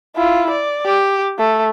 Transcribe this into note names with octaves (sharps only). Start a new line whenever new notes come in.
E4 F4
D5
G4
A3